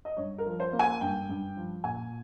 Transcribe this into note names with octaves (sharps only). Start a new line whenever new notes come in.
D#5
G2 C#5
A#4
F3
C5
A#3
G#5
G2 G5
G2
F3
A#2 G#5